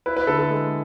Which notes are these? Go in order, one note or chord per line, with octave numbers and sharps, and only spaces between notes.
E4 B4
B4
D3 A4
A4
G#3